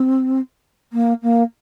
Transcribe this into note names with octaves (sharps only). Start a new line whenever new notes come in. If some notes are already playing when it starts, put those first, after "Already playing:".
Already playing: C4
A#3
A#3